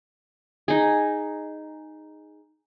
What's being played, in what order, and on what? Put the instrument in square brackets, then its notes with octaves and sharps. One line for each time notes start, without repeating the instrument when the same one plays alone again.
[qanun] D#4 G#4